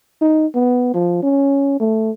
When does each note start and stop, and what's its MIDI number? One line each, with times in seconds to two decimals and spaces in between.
0.22 0.47 63
0.55 0.90 59
0.94 1.22 53
1.23 1.78 61
1.81 2.11 57